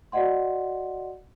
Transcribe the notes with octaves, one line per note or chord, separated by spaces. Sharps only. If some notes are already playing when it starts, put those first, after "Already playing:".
F#4 D5 D#5 F#5 C6